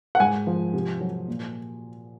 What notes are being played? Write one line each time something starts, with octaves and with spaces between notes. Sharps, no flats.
F#5
G#2 G#5
F3
C3
F#3
A#2